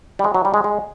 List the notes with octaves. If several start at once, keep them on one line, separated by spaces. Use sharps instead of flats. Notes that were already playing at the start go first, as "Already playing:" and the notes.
G3
G#3
F#3
G3
G#3
G#3